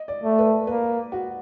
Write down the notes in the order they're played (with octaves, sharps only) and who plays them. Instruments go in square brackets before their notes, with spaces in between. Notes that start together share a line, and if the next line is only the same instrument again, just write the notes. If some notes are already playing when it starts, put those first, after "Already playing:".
Already playing: [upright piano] D#5
D5
[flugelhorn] A3
[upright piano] B4
[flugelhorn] A#3 [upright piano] B4
[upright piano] F#4